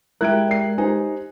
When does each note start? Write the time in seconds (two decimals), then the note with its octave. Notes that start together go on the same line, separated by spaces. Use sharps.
0.21 G#3 E4 G4 A#4 F#6 G#6 D7
0.48 D5 C7
0.78 D#4 G4 C5 G#5